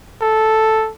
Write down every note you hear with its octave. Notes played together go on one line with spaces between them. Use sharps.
A4